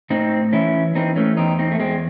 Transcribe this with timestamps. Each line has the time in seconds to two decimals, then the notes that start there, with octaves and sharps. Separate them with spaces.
0.10 A2 C4 D#4
0.53 E3 C#4 E4
0.95 E3 C4 D#4
1.16 A3 C#4
1.37 E2 C4 D#4
1.59 C4 D#4
1.72 A3
1.80 E2 G#3 C4